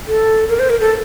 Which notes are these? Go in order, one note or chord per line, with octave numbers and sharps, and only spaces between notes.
A4
A#4
C5
A#4
A4